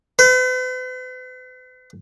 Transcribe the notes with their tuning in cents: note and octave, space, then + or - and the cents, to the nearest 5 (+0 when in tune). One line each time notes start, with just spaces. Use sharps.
B4 +45